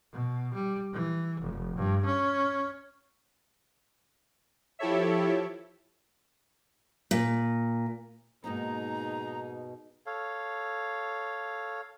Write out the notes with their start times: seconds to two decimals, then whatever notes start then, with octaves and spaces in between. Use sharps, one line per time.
0.13 B2
0.54 G3
0.93 E3
1.41 F1
1.77 G2
2.05 C#4
4.79 F3 E4 G4 A4 C#5 E5
7.11 A#2
8.44 G#2 B2 A#3 C4 D#4 G#4 A#5
10.06 A4 C#5 F5